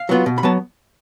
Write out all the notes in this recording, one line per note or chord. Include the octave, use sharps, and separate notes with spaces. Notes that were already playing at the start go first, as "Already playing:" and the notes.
Already playing: F5
F#3 B3 F4
B2
B5
F#3 B3 A5